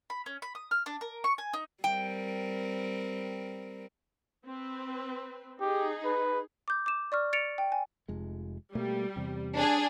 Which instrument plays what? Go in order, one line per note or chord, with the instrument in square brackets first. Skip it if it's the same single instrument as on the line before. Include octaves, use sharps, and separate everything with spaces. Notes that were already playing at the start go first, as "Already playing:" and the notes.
[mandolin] B5
C#4
B5
D#6
F6
D4
A#4
C#6
G#5
D#4
[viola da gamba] G3 C4 A#4 [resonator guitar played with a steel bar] G5
[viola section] C4 B4
[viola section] D#4 G#4 [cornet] G4
[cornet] B4
[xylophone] D6 G6
D6 E7
D5 C#6 F6
A6 C#7 D7 F7
G5
G#5
[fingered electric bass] F1 F2 G#3
[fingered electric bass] B2 A3 A#3 [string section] G3
[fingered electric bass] E2 C3
[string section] D4 G#4